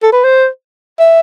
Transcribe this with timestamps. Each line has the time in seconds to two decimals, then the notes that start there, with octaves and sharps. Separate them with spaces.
0.02 A4
0.12 B4
0.24 C5
0.99 E5